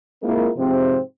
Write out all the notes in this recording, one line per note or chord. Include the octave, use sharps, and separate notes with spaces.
G#3 A#3 C4 E4 F4 A#4
G#2 C3 F3 C4